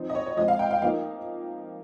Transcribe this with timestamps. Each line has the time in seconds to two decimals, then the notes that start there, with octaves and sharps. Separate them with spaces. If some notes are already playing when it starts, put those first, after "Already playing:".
Already playing: F3 C4 D#4
0.10 D#5
0.15 C#5
0.26 C#5
0.37 F3 G#3 C4 D#5
0.48 F5
0.59 G5
0.71 F5
0.82 F3 A#3 D#4 F5